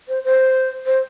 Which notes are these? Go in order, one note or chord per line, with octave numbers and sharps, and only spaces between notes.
C5
C5
C5